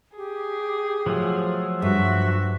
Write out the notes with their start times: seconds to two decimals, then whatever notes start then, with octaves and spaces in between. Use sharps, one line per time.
0.17 G4 G#4
1.06 F3 F#3 A3
1.82 G2 F#4 E5